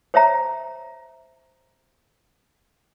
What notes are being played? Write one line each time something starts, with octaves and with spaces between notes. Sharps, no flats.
C5 C#5 E5 A#5